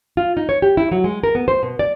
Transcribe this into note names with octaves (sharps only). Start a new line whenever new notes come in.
F4
D#4
C#5
G4
E4
F#3
G#3
A#4
B3
C5
B2
D5